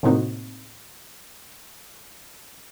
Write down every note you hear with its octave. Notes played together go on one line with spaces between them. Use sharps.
A2 C3 A#3 C4 D#4 F#4